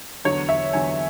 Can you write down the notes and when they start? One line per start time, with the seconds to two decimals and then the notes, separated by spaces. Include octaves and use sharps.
0.25 E2 D3 F#3 C#5
0.49 E5
0.73 E2 D3 F#3 G#5